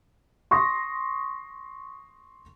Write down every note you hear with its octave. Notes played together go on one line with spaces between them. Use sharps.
C6 C#6 D#6 A#6